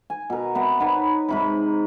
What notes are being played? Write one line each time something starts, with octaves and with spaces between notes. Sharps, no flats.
G#5
B2 A#4
C3 B3 A#5
B3 D#4 B4 C#5
G#2 C3 B5